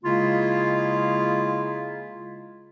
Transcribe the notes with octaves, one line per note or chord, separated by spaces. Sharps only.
C#3 G#3 A#3 E4 F4